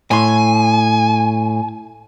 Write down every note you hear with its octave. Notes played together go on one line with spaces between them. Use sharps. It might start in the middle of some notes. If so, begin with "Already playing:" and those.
A2 G#5 C6